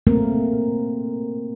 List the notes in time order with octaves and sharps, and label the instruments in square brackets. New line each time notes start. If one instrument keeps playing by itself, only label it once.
[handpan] A3 A#3 C4 A#4